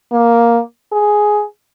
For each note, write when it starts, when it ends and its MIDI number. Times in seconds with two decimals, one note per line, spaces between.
0.12 0.60 58
0.92 1.44 68